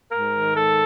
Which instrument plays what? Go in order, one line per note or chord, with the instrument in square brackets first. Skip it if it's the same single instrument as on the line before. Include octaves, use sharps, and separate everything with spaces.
[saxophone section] G#2 A#4
D#3
G#2 A4